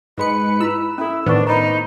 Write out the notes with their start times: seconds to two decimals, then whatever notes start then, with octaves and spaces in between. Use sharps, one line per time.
0.18 G#2 G#3 B4 C#7
0.60 E4 B5 E6
0.98 C#4 E4 A4
1.26 A2 D#3 B3 D4 B4 C5 C#6
1.47 D#4 A#5 B5